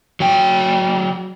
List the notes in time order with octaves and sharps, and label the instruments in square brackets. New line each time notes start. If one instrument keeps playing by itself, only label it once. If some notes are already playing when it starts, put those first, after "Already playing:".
[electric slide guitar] F#3 G5